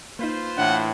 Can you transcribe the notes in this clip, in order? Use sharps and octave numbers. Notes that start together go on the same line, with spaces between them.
A#3 D#4 F4 B4 C5
A2 E3 D4 F#5